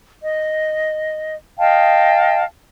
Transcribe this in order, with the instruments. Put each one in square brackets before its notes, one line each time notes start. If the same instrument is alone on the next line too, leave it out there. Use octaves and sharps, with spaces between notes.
[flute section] D#5
D#5 F5 G5 A5